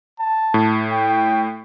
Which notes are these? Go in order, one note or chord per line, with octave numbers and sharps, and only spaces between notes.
A5
A2
G5